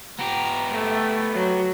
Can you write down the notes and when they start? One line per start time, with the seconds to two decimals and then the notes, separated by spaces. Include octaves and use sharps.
0.19 B3 G4 A#5
0.72 A3
1.35 F#3